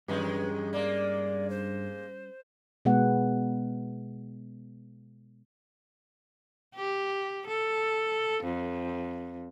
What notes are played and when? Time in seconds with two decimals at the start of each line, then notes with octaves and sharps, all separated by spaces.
0.08 E2 G2 D#3 G3 G#3 C#4 B4
0.73 G#3 A#3 D5
1.50 C5
2.85 B2 G#3 B3 F#5
6.76 G4
7.47 A4
8.44 F2